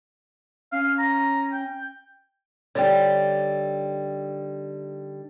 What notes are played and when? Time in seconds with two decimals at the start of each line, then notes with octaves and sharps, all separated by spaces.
0.72 C#4 F5
0.99 A#5
1.52 G5
2.75 D3 G3 D#4 C#5 D5 G5